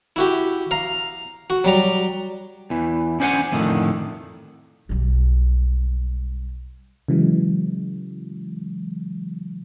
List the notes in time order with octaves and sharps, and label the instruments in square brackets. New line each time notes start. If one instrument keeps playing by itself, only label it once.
[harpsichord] E4 F#4 G4
F5 A#5
F#4
F#3 G3 A#5
[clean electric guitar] E2 E3
C#4 D4 C5 C#5 F#5 G#5
F2 A2 D3 D#3
[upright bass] B1 G3
[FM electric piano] C#3 E3 F#3 G#3